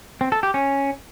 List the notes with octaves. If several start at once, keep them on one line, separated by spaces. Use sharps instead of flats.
C4
A4
G4
C#4